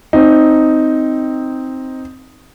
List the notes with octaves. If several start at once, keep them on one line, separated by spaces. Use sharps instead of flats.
C4 D#4